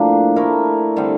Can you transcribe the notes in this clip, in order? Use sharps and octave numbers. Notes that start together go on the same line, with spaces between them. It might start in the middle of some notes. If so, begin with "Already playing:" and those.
Already playing: A2 F3 A#3 D4
A3 E4 A#4
D3 G3 C4